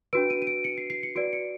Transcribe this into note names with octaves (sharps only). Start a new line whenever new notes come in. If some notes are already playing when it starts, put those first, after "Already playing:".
D4 F#4 B4 D7
D#7
D#7
D7
C#7
C7
C7
C#7
F#4 B4 D5 D7
C#7